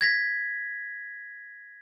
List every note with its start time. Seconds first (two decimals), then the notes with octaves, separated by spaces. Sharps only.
0.01 G#6 A#6 B6